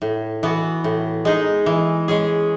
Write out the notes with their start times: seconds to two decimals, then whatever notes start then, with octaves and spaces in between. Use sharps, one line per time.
0.02 A2
0.43 E3 B3 F#4
0.84 A2
1.25 G#3 D#4 G#4
1.66 E3
2.08 G#3 C#4 G#4